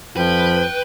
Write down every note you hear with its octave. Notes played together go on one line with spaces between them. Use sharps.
F2 F3 B4 G5